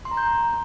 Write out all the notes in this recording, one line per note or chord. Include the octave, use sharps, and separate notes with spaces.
C6
A#5
G6